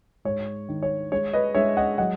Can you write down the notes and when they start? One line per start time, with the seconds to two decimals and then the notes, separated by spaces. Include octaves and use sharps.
0.25 G#2 C#5
0.69 D#3
0.83 C#5
1.12 G#3 C#5
1.33 B4 D#5
1.55 G#3 C#5 E5
1.77 D#5 F#5
1.98 F#3 D#5 F#5